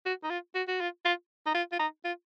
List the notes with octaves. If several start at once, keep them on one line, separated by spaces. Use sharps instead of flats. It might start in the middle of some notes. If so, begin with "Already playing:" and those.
F#4
D#4
F4
F#4
F#4
F4
F4
D#4
F4
F4
D#4
F4